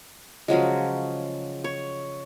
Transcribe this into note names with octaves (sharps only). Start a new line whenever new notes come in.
C#3 F3 F#3 G#3
C#5